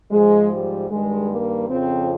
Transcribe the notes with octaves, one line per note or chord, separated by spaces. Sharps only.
G#2 F3 G#3
G3
G2 D#3 G#3
A#3
F2 C#3 F3 C4